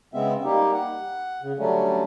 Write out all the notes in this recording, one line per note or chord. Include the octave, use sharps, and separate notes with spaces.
C#3 G#3 B3 C4 E5
G3 A#3 D#4 G4
F#5
C#3
D3 F#3 G3 A3 C#4